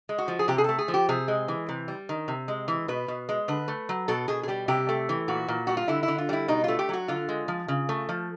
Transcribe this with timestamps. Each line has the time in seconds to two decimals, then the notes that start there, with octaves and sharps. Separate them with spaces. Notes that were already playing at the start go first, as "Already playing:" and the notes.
0.09 G#3
0.18 F#4
0.28 F3
0.39 G#4
0.48 C3 G4
0.58 G#4
0.64 A3 A4
0.79 G#4
0.88 F3
0.94 G4
1.09 C3 G#4
1.28 G#3
1.48 E3
1.69 C3
1.88 G3
2.09 D#3
2.28 C3
2.48 G#3
2.68 E3
2.88 B2 B4
3.08 B2
3.29 G#3
3.48 D3 B4
3.68 A3
3.89 F#3
4.08 B2 A4
4.28 B2 G#4
4.43 G#4
4.48 G3 G4
4.68 C3 G4
4.89 A3
5.09 E3
5.28 A#2 F#4
5.48 A#2
5.67 G3 F#4
5.77 F4
5.88 D3 E4
6.03 E4
6.08 D3
6.18 F4
6.29 G3 E4
6.48 B2 D#4
6.64 A3 F4
6.79 G4
6.89 F#3 F#4
7.08 D3 F4
7.29 G#3
7.48 F3
7.68 C#3
7.89 A3
8.09 F3